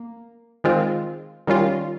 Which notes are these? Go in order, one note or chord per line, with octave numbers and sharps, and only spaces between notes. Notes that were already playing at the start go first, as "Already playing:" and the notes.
Already playing: A#3
D#3 G#3 C4 F4
D#3 G3 C#4 F4